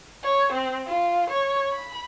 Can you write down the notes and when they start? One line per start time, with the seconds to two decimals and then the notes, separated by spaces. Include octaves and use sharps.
0.24 C#5
0.53 C4
0.87 F4
1.30 C#5
1.73 B5